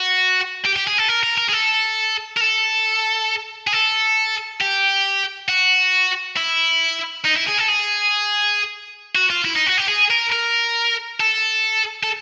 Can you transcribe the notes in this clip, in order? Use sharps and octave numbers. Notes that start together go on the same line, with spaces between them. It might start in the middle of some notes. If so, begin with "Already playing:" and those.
Already playing: F#4
G4
G4
G#4
A4
A#4
A#4
A#4
G#4
A4
A#4
A4
G#4
A4
G4
F#4
E4
D#4
E4
G#4
A4
G#4
F#4
F4
E4
D#4
F#4
G4
G#4
A#4
A#4
A4
A4